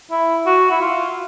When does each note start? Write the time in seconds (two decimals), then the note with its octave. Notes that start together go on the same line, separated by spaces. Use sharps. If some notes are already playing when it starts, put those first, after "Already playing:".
0.11 E4
0.46 F#4
0.71 E4
0.81 F4